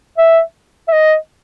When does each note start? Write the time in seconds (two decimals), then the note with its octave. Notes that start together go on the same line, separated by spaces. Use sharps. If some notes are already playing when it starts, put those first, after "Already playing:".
0.18 E5
0.88 E5
0.92 D#5